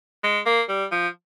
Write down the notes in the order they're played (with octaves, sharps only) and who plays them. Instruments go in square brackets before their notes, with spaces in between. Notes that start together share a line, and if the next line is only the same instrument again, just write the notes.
[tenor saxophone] G#3
A#3
G3
F3